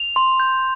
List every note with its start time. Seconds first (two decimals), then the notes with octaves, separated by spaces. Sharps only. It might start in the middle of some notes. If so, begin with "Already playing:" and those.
Already playing: F7
0.16 C6
0.40 G6